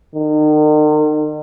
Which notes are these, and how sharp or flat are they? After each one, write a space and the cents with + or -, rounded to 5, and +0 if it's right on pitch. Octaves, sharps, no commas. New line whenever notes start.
D#3 -40